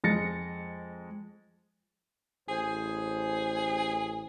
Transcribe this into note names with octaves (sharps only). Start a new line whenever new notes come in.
F2 G#3 A6 A#6 C#7
A1 G#4 C5